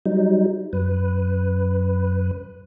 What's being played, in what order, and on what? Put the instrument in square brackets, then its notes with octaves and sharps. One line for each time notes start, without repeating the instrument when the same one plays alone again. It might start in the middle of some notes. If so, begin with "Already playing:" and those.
[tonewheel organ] F#3 G3 D#4
F#2 B4